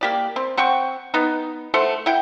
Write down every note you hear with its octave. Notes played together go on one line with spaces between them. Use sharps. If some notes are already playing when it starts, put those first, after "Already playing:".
A#3 G4 D5
C4
C4 F#5 G5 C#6
B3 D#4
A3 A4 C5 F#5
E4 F#5 G5